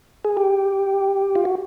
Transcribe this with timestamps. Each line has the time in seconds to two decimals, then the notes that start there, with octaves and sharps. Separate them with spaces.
0.25 G#4
0.37 G4
1.35 F4
1.45 F#4